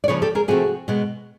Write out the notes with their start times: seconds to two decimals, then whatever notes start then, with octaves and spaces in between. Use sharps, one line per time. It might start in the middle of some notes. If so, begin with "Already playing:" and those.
0.04 D5
0.08 C#3 F3 A#3 B4 C#5
0.22 G4 A4
0.35 G#4 A#4
0.48 C3 F3 A3 C4 F#4 G#4
0.88 B2 G#3 B3